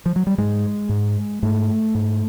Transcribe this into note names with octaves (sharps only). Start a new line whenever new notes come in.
F3
F#3
G3
G#2 G#3
G#2
G#2 A3
G#2